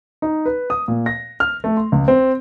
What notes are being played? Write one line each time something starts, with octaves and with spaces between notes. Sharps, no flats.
D#4
B4
D#6
A#2
A#6
F6
A3
C6
C#2
C4